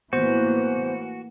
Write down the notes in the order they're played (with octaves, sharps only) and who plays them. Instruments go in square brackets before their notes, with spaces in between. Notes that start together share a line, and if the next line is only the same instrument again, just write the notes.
[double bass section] A2 E3 A#3 [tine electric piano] B3 C5 G6 [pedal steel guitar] F#4